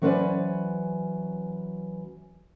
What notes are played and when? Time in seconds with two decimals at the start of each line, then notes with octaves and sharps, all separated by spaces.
0.02 E3 F#3 C#4 B4 C5 D5